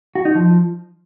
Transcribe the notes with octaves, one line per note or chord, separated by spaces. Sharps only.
F#4
D#4
F3